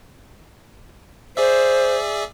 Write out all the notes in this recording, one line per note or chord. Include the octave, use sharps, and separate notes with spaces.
G#4 C5 D5 E5